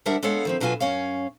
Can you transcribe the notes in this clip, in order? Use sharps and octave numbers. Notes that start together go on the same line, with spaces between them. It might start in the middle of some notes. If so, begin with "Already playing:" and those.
D2 G3 D4 A#4 E5 F#5
G#3 B3 A4 C#5 F5 F#5
D#3 F3 C4
B2 F#3 C#4 F4 B4 G#5
F#2 C#4 C#5 F5